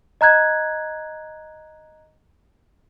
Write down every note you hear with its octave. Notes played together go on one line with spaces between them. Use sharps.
D#5 A#5 F#6 G#6